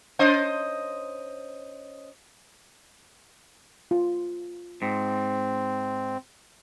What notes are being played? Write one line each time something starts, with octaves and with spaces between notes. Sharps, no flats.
C#4 C5 D#5
F4
G#2 C4